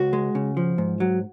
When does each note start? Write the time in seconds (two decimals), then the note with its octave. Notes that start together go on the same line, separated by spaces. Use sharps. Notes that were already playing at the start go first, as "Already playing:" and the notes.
Already playing: C#2 F#4
0.13 G#3
0.35 C#3
0.57 F3
0.78 G#2
1.00 F#3